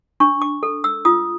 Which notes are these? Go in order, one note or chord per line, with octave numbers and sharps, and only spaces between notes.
D4 C#6
D6
A4
E6
F4 D#6